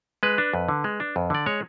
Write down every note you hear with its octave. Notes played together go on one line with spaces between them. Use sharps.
G#3 B4
D4
F2
D3
G#3
D4
F2
D3 D5
G#3 C#5